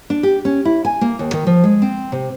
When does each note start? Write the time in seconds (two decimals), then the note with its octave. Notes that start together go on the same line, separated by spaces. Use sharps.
0.10 D4
0.23 G4
0.45 C#4
0.65 E4
0.85 G#5
1.01 A#3
1.19 D#2
1.33 D#3
1.47 F3
1.64 G#3
1.82 C4
2.12 C3